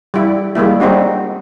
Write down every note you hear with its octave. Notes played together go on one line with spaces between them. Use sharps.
G3 E4
G3 G#3 A#3 E4
G3 C4 D4 D#4 F#4